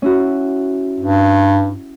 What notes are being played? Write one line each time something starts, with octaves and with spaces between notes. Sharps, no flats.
C#4 E4 F#4
G2